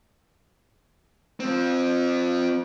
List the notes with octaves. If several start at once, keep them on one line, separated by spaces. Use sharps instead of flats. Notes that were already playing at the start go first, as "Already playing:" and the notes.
F3 C4